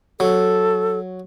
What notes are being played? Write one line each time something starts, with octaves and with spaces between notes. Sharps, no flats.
F#3 A4